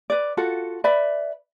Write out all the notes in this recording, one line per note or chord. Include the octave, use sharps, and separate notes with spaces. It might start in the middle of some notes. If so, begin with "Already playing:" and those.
B4 D5
F4 F#4 A4 F#5
B4 D5 E5 B5